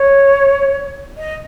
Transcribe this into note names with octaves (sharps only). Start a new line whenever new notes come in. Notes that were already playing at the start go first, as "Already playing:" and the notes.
Already playing: C#5
D#5